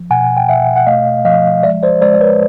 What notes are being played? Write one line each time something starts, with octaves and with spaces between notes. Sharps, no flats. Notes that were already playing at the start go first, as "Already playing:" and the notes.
Already playing: F3
B2 F#5 G#5
G5
B2 E5 F#5
F#5
A3 D#5 F5
F3 D#5 F5
G#3 D5 E5
C5 D5
G#3 C5 D5
D5
B4 C#5